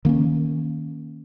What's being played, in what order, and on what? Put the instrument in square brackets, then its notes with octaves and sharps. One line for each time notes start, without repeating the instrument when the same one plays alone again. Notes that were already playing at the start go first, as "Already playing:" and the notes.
[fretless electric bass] D#3 A#3 C#4